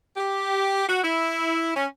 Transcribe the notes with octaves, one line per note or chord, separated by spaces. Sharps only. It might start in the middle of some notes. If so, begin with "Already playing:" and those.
G4
F#4
E4
C#4